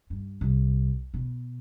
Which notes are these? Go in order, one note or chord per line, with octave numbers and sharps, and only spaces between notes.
G2
C2
B2